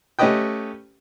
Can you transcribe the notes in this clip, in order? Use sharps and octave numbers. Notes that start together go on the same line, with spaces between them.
A3 C#4 G4 B4 D#5 G5